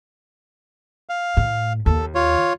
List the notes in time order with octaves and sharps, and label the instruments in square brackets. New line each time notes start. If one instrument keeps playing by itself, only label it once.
[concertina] F5
[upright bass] A2
[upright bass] D#2 [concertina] A4
[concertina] F4 C#5